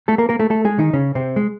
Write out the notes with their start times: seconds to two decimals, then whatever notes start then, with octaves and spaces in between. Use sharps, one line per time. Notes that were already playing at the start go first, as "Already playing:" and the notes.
0.08 A3 A4
0.18 A#3 A#4
0.29 A#3 A#4
0.39 A3 A4
0.50 A3 A4
0.65 G#3 G#4
0.79 D#3 D#4
0.93 C#3 C#4
1.15 C3 C4
1.36 G#3